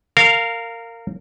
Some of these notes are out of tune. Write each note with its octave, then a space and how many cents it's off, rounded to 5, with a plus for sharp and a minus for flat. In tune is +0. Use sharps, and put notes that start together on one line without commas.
A#4 -20 F5 +0